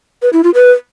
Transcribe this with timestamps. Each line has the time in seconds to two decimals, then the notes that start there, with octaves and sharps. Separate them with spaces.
0.22 B4
0.33 E4
0.44 F4
0.54 B4